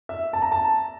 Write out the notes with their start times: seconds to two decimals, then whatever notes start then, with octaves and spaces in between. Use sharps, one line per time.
0.09 E5
0.33 A5
0.42 A#5
0.52 A5